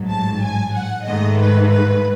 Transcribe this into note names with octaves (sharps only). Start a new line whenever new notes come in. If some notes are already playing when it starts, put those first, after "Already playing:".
Already playing: A1 G#2 F#3
A5
G#5
F#5
G#2 D#3 A3 D#5
B4
B4